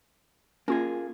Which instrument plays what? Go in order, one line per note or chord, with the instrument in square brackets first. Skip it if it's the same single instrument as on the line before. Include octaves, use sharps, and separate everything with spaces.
[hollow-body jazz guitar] A#3 G#4 [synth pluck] C#4 F4